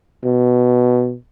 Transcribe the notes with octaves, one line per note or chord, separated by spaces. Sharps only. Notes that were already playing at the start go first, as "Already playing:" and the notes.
B2